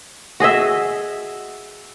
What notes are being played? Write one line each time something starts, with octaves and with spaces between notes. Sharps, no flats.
F#4 G#4 D#5 E5